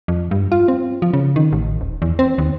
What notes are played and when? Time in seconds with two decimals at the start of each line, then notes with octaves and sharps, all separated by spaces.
0.08 F2
0.31 G2
0.52 F4
0.68 C4
1.02 F3
1.13 C#3
1.36 D#3
1.52 A1
1.81 D#1
2.02 E2
2.19 C4
2.38 D#2